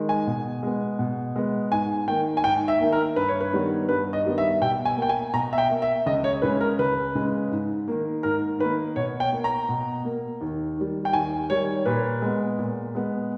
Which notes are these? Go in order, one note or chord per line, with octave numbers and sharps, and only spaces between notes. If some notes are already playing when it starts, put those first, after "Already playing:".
Already playing: D#3 G#3
G#5
B2
G#3 B3
B2
G#3 B3
G#2 G#5
D#3 A#3 G5
G#5
G#2 G5
E5
D#3 A#3
A#4
G2 B4
C#5
B4
D#3 G3 B3
G2 B4
D#5
D#3 G3 B3
E5
B2 G5
G#5
A#3
G5
G#5
B2 A#5
E5
G5
A#3
E5
C#2 D#5
C#5
C#3 G#3 B4
A#4
C#2 B4
C#3 G#3
G#2
D#3 A#3
G#2 A#4
D#3 A#3 B4
B2 C#5
G5
A#3
A#5
B2
A#3
D#2
D#3 G3
G5
D#2 G#5
D#3 G3 C#5
A#2 B4
G#3 B3
A#2
G#3 B3